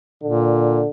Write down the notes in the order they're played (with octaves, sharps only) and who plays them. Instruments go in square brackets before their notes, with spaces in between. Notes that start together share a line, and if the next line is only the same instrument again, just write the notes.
[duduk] A#2 [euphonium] D3